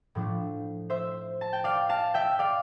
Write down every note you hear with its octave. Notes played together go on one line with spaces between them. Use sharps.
A2 F3 A3 D4
C5 E5
A5
G5
D5 F5
F5 A5
E5 G5
D5 F5